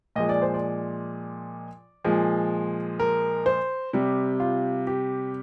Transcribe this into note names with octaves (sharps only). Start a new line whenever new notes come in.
A#2 F3 G#3 D#5
D5
C5
D5
A#2 F3 G#3
A#4
C5
C3 G3
F4
G4